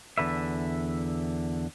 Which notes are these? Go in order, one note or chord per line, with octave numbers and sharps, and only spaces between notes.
E2 D3 B4 E5